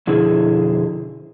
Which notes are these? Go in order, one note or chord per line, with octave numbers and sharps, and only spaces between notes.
F2 B2 D3 E4 G#4